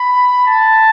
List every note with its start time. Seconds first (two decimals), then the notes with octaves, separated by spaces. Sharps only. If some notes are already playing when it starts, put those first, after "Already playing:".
Already playing: B5
0.47 A5